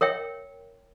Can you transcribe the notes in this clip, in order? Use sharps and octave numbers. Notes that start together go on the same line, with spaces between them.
A#4 C#5 E5 G5